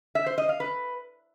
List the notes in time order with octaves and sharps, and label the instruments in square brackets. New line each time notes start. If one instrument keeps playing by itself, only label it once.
[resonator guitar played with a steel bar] E5
C5
D#5
F5
B4